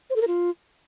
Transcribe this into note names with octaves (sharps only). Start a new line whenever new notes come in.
C5
A4
A#4
F4